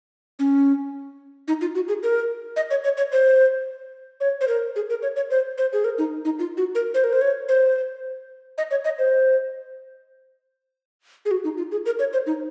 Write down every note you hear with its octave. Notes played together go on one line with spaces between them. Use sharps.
C#4
D#4
F4
F#4
G#4
A#4
D#5
C#5
C#5
C#5
C5
C#5
C5
A#4
G#4
A#4
C#5
C#5
C5
C5
G#4
A#4
D#4
D#4
F4
F#4
A#4
C5
A#4
C5
C#5
C5
D#5
C#5
D#5
C5
G#4
F#4
D#4
F4
G#4
A#4
C#5
C5
D#4